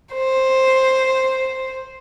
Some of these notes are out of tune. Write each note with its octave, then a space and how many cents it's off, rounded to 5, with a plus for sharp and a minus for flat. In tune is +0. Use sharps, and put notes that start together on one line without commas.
C5 +5